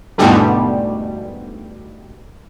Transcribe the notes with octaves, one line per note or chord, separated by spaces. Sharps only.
E2 G#2 B2 D3 G3 A3